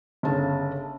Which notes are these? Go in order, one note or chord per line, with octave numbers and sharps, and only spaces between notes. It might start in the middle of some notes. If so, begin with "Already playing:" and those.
G1 C#3 A5